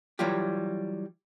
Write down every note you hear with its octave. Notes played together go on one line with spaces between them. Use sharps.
E3 F#3 G3 F4 G4